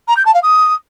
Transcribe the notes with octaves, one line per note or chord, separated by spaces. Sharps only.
A#5
G6
A5
F5
D#6